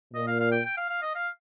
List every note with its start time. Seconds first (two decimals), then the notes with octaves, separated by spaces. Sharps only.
0.14 A#2 D#5
0.27 F5
0.40 F5
0.52 G5
0.65 G5
0.77 F5
0.90 F5
1.02 D#5
1.15 F5